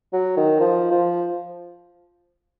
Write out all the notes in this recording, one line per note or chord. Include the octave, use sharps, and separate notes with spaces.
F#3
D#3
F3
F3